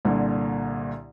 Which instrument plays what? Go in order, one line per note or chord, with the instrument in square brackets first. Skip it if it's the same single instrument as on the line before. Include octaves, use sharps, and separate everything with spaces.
[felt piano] C2 A#2 D3